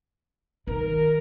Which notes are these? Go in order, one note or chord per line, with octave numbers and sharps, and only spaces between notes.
D#3 A#4